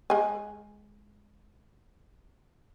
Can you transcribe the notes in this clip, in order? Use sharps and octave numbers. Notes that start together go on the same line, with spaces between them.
G#3 G#5